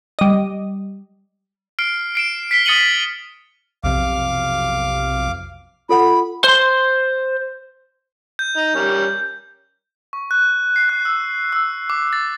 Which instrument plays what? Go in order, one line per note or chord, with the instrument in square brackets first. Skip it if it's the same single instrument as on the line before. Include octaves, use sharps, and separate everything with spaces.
[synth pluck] G3 D#5
[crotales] F6 C7 D7
C7 D7 E7
B6 C7 D7 G7
D#6 A6 C#7 D#7 F#7 G7
[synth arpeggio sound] B1 F2 C3 [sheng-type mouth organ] F5 D6
[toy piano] F4 A4 F#5 [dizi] B5
[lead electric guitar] C5 C6
[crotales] G6
[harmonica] D#4
G3 C#4 A#4
[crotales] C#6
F#6
C7
F#6
E6
E6
D6
A6